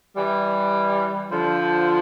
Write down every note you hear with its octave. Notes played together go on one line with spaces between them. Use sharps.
E3 G3
D3 F3